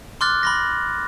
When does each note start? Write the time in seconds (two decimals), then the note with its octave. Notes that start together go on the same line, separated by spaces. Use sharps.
0.21 C6 D6 F6 F#6 A6
0.43 B5 C6 A#6